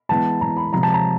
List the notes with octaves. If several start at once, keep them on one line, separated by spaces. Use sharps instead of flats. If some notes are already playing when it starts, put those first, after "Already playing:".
E3 G#3 B3 A5
E3 G#3 B3 A#5
B5
C3 F3 G#3 C4 A#5
A5
A#5